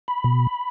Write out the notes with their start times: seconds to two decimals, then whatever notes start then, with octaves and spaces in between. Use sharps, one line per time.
0.08 B5
0.24 B2